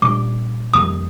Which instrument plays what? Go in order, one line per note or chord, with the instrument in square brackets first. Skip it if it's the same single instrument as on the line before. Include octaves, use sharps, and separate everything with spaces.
[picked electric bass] A#2 G3 D4 [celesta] D6
[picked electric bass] F2 D#3 G3 A#3 [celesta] D#6